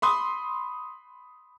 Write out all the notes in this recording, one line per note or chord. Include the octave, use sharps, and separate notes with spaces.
B5 C6 D#6